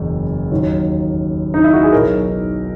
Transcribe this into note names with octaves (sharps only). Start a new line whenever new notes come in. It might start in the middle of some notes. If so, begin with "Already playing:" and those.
Already playing: F#1 E2 B2 F#3
D#2 D#3 F#3
D#4
E4
F#4
G#4
B1 B2 F#3 A#4